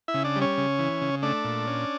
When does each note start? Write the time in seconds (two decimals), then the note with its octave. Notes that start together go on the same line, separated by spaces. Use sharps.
0.08 E4 E5
0.14 C#3
0.24 D4 D5
0.36 G3
0.42 C#4 C#5
0.58 C#3
0.79 E3
1.02 C#3
1.23 A3 D4 D5
1.45 A#2
1.67 C#4